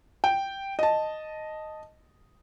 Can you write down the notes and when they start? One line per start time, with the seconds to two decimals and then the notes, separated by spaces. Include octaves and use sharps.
0.24 G5
0.79 D#5 A5